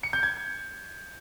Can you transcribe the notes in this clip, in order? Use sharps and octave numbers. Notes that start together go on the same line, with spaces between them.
C#7
G6
G#6